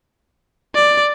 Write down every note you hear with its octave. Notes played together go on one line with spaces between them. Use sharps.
D5